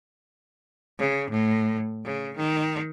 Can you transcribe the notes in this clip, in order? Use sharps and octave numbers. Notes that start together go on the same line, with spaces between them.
C#3
A2
C#3
D#3